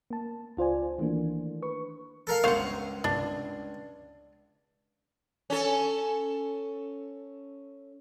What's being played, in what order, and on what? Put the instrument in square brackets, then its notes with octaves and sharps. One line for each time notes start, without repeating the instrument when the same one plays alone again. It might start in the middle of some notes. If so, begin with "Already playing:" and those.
[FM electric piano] A#3 A5
C#2 F4 C5 D5 G#5
D#3 E3 A3 A#3 D4
B4 C#6
[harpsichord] A4 A#4 F5
[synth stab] G1 C5 C#5 [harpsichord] C#2 [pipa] F5 F#5
[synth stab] G1 C2 [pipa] D4
[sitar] C#4 A4